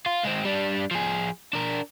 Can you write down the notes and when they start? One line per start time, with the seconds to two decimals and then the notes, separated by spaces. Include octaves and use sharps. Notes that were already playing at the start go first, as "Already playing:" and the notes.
0.06 F4
0.24 G#3 C4
0.45 G3 D4
0.91 F3 G#4
1.53 D4 A#4